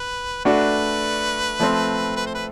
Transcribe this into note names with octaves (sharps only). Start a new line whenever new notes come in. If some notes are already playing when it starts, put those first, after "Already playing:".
Already playing: B4
A3 D4 F#4 B4
F3 A3 C4
B4
C5
B4